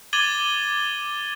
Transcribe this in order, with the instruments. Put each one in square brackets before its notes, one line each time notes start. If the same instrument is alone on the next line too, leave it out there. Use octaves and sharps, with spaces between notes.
[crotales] D6 G#6 A6 D#7 F#7 G7